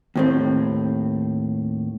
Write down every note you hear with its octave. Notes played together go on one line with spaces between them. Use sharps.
D#2 A2 C4